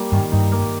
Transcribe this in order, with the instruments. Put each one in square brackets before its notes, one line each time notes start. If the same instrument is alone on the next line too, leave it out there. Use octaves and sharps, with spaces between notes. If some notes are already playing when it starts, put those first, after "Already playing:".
Already playing: [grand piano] G3 A#3
[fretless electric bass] G2 [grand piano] D#3
[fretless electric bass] G2 [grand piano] D#4
[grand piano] A#3